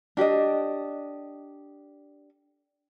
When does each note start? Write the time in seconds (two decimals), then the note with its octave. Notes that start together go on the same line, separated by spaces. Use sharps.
0.17 D4 G4 A4 D#5